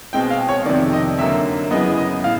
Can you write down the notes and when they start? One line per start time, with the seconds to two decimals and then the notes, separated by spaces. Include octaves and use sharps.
0.13 B2 G#3 C4 G5
0.30 F5
0.49 C#5
0.66 F2 C3 D#3 D5
0.93 D#5
1.19 F#2 D3 F#3 A#3 E5
1.71 F#2 C#3 E3 G#3 B3 D#5
1.98 D#5
2.24 A2 F5